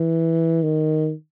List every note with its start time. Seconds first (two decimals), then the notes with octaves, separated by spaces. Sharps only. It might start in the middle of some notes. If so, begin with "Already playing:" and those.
Already playing: E3
0.63 D#3